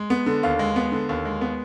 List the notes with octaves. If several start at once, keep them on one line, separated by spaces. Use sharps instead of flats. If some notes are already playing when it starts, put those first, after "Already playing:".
Already playing: G#3
B3
D3
D#2 F5
G#3
B3
D3
D#2
G#3
B3